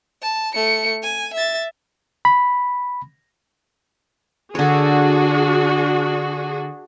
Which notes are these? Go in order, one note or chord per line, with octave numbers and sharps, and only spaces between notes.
A5
A3 C#7
G#5
E5 A6
B5
D3 D4 F#4 G#4 C#5